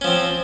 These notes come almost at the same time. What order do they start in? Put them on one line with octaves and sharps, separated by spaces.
C#4 F3 C4